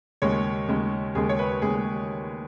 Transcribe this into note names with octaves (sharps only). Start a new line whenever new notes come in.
D#2 C#3 G#3 C#5
D#2 C#3 G#3
D#2 C#3 G#3 G#4
C#5
B4
D#2 C#3 G#3 G#4